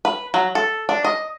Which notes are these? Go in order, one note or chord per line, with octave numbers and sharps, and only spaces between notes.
B4
F#3
A4
D4
D#5